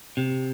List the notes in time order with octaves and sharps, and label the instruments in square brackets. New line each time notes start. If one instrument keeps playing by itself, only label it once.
[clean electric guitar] C3